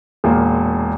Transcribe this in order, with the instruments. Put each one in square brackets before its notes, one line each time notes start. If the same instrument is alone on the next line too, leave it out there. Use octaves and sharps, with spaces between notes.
[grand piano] E1 A#2 A#3